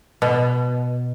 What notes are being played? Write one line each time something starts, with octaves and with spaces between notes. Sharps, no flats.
B2